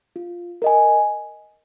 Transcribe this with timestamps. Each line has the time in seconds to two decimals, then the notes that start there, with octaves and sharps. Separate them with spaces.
0.16 F4
0.62 A#4 D#5 G#5